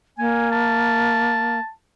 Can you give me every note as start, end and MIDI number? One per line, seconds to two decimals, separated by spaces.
0.18 1.59 58
0.18 0.48 80
0.51 1.70 81